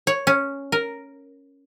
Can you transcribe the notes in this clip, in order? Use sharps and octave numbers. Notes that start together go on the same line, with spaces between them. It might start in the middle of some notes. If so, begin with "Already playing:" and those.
C#5
C#4
A#4